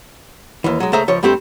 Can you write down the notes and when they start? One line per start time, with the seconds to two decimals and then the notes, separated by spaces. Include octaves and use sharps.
0.64 D#2 E3
0.80 F#3 G#3
0.93 C#2 A3 G#4 C5 E5 A#5
1.08 C#2 F3 C#5
1.23 G2 G3 A3 C4 G4 C5